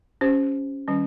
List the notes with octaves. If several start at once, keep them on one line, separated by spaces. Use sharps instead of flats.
C#4 G4 C5
D#3 G3 C#4